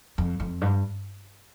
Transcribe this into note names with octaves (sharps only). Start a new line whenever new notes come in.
F2
F2
G2